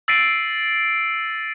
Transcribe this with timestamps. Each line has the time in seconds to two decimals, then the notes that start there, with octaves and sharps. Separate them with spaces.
0.08 E6 A6 B6 C7 D7 D#7